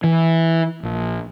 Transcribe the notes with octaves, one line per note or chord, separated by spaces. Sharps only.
E3
A#1